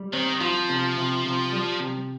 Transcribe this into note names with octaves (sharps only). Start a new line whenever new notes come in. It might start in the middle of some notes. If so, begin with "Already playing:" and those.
Already playing: G3
D#3 C4
F3 F4
C3
C3
C3
G3
C3